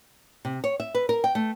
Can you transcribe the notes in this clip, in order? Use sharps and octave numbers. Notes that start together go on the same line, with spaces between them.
C3
C#5
E5
B4
A#4
G5
A3